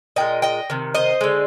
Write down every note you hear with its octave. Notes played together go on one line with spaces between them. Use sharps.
A#2 G#3 D#5 G5
D#5 G5
C3 D#3
C5 D#5
D3 G#3